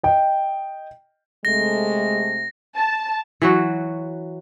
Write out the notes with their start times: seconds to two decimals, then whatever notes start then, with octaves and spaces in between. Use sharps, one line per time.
0.03 D#5 G5
1.45 C3 G#3 A3 A#6
2.76 A5
3.42 E3 F#3 F#4